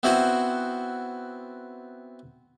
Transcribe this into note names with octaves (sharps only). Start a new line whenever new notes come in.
B3 C4 E4 F#4 C5 F#5